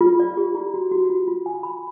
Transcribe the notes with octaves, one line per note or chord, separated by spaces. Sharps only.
F4
D5
G4
E4
F#4
F#4
F4
F4
G#5
B5